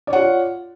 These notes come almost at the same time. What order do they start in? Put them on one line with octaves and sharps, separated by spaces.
D5 C#5 F#5 F4